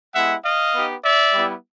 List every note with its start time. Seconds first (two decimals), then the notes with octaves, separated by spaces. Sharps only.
0.14 G#3 B3 E4 G4 E5 F#5
0.44 D#5 F5
0.75 B3 D#4 G4
1.04 D5 E5
1.34 G3 B3 E4 G4